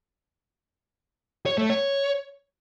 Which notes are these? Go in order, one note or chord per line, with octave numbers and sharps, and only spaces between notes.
C#5
A3
C#5